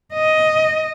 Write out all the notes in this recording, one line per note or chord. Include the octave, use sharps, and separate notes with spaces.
D#5